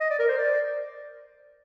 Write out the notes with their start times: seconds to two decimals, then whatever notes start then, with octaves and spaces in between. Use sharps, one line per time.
0.01 D#5
0.10 D5
0.19 A#4
0.29 C5
0.38 D5